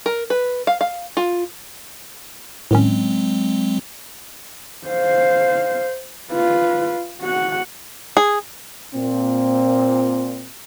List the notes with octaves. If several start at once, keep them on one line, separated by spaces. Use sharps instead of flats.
A#4
B4
F5
F5
F4
A2 D#3 F#3 G#3 C4 C#4
C5 F5
F4 B4
F#4 F#5
G#4
A#2 C4